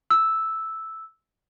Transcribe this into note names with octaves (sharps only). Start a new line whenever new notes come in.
E6